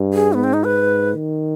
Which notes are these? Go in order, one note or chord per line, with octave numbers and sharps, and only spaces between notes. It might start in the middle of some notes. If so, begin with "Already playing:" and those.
Already playing: G2
G#4
G#2 B3
C4
D#4
B4
D#3